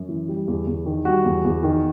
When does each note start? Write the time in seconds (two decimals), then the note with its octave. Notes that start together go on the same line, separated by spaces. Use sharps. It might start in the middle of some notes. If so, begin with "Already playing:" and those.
Already playing: F#2
0.09 E3
0.28 G3
0.48 E2
0.67 E2
0.86 D#3
1.05 G3 F#4
1.25 E2
1.44 E2
1.63 D#3